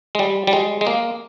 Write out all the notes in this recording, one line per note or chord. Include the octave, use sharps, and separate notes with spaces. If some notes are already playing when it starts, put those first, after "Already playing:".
G#3
G3
G3
G#3
G#3
A#3